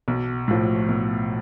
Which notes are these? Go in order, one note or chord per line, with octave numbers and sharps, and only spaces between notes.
B1
A2 F3
B1